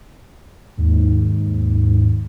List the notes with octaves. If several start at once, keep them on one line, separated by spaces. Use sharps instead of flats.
D#2 G#2